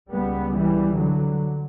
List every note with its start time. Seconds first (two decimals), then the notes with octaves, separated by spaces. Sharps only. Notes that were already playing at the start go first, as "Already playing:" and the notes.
0.11 C#2 C#3 G3 B3
0.54 E3 G3
0.97 D3 F#3